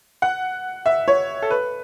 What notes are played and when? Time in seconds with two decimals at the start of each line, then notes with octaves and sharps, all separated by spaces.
0.22 F#5
0.86 E5
1.08 C#5
1.42 A4
1.51 B4